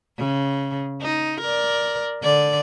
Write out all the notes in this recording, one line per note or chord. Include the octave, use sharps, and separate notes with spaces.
C#3
D#4
A#4 D5
D3 D5